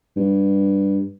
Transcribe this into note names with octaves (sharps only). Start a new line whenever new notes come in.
G2